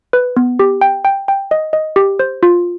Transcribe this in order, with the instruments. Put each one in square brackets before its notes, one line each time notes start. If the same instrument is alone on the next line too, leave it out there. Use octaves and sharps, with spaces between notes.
[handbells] B4
B3
G4
G5
G5
G5
D#5
D#5
G4
C5
F4